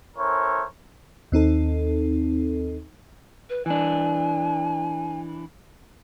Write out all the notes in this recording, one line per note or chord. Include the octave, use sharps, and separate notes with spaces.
C#4 E4 A4 A#4 C5 C#5
D#2 C4 D#4 A4
B4
E3 D4 G#5